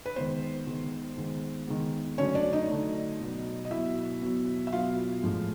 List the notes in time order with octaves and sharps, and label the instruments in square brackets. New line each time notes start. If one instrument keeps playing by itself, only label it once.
[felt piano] B4
D#3 G#3 B3 C5
D#3 G#3 B3
D#3 G#3 B3
D#3 G#3 B3
D3 F#3 A3 C#4 C#5
D4 D5
D#4 D#5
D3 F#3 A3
B2 F#3 B3
D#5
B2 F#3 B3 E4 E5
B2 F#3 B3
E5
B2 F#3 B3 F4 F5
A2 F3 G#3